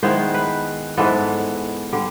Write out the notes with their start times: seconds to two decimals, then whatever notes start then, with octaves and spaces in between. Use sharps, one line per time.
0.03 D#3 G#3 B3 E4 C5
0.34 B4
0.97 G#2 E3 G#3 B3 A4
1.93 D3 G3